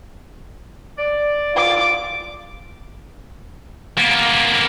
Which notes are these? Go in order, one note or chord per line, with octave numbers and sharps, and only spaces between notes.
D5
F4 D6
A#3 B3